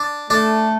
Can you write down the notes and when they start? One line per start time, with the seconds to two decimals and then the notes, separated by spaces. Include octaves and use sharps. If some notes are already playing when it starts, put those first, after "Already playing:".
Already playing: D4
0.30 A3 D4